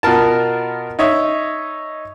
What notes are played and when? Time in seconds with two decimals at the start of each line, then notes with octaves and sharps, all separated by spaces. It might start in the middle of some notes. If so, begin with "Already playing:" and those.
0.03 B2 B3 F4 A#4 A5
0.99 D#4 C#5 E5